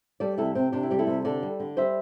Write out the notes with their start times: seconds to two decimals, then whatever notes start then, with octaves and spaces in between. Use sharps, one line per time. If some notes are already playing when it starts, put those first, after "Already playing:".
0.20 G3 A4 D5
0.38 C3 E4 A4
0.55 C3 C4
0.72 C3 D4 G4
0.83 E4
0.91 G3 G4
0.99 E4 A4
1.07 C3
1.25 D3 A4 D5
1.43 G3
1.60 D3
1.77 G3 C5 E5